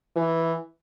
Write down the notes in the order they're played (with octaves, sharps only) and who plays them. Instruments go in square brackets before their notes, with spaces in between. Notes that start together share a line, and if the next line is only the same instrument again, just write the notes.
[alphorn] E3